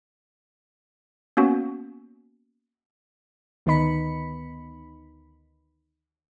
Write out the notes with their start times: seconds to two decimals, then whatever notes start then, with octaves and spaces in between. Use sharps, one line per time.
1.37 A#3 B3 C#4 F#4
3.66 D2 D#3 B3 D#4 B5 C#7